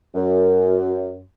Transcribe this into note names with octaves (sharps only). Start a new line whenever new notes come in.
F#2